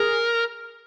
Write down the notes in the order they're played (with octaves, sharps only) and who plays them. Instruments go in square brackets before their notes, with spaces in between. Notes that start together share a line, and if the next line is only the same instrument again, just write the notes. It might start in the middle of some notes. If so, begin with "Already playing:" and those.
Already playing: [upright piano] G#4 [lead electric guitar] A#4